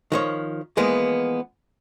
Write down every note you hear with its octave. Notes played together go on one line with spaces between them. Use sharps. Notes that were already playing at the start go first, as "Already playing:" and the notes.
D#3 F3 C#5
E3 F3 G#3 A#3 B3